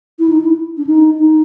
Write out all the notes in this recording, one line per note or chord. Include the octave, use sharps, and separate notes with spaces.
E4
D#4
E4
D4
D#4
D#4